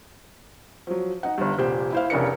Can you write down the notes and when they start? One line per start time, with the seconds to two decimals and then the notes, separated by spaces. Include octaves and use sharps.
0.87 F3 F#3
1.23 D#4 F#5
1.38 G1 G2
1.58 F1 A#2 G4 C5 G5
1.92 E4 C5 F5
2.10 F1 C#3 D4 A#4 C#7